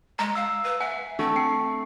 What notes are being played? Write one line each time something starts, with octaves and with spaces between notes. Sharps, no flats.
G#3 A#5
F5 E6
B4
E5 F#5 G#5
A3 C4 D4
G5 C7